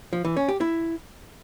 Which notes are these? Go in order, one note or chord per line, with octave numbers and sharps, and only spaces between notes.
F3
E3
C#4
G4
E4